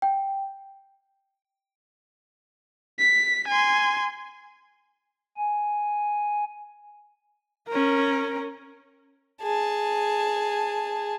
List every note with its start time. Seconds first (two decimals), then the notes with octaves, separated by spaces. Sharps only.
0.02 G5
2.99 B6
3.48 G#5 C6
5.37 G#5
7.69 C#4 A#4
9.42 G#4 A5